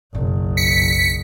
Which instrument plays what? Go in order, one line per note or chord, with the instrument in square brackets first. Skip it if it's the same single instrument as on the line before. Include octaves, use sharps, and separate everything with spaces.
[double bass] F#1 [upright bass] B1
[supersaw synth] B6 C#7